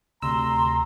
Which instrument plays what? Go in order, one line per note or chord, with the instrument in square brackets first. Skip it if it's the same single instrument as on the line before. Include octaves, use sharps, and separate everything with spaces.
[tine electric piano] D2 C3 E6 [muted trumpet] A#5 [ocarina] C6